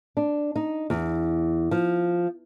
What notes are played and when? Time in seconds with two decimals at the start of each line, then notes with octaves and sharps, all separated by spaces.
0.17 D4
0.56 D#4
0.90 E2
1.71 F3